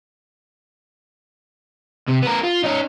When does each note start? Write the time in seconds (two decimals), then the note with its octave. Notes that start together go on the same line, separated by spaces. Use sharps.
2.09 C3
2.23 B3 A#4
2.44 F4
2.64 C#4 D#4